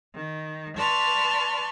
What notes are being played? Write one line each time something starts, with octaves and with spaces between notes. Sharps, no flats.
D#3
B4 D5 A5 C6 C#6 F6